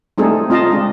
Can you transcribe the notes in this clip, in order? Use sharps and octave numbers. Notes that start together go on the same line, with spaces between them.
G3 A3 C4 D#4 G#4 A4
C4 F4 D#5 F5 A5 A#5
G#3 D4